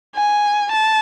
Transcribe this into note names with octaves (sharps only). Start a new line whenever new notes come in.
G#5
A5